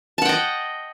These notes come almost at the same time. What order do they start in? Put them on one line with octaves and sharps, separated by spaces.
A5 F#5 G5 D#5